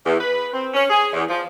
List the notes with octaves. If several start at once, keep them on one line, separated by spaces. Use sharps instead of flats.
E2
B4
C4
C#4
G#4
E2
F3